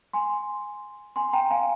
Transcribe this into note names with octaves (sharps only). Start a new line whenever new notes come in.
G#5 C6
G#5 C6
G5 A#5
F5 G#5